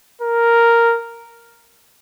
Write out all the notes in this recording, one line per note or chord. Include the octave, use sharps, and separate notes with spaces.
A#4